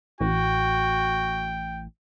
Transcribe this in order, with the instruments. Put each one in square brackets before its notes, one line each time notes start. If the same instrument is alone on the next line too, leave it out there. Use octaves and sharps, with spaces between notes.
[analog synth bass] A1 [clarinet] F#4 [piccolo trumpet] G5